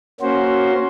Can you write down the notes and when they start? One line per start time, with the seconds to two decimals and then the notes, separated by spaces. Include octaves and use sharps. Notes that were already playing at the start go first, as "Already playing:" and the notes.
0.20 A#3 C#4 F#4 C5